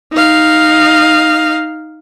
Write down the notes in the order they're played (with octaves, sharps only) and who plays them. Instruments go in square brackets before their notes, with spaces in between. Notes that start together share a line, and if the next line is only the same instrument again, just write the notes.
[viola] D#4 F5